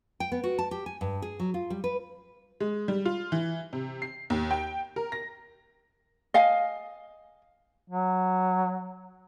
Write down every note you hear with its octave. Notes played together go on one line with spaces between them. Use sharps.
G5
B3
F#4
A5
G4
G#5
G2
G#4
F#3
F4
G3
B4
G#3
G3
F4
E3
C3
C7
D#2
G5
A#4
A#6
D#5 F5 G#5
F#3